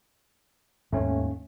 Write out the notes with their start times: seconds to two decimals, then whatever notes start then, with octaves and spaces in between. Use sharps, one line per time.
0.93 D#2 G#2 D#3 A3 C#4